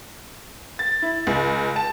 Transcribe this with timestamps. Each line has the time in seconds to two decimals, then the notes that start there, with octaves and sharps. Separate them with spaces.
0.79 A6
1.02 E4
1.27 C#2
1.76 A5